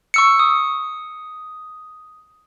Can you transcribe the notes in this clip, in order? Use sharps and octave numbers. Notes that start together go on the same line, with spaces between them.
C#6 E6 C#7
D#6